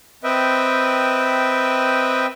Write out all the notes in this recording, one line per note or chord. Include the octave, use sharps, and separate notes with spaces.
C4 B4 D#5 E5 G5